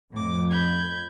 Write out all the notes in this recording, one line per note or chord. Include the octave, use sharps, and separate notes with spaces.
F2 A2 D6
B5 G6 G#6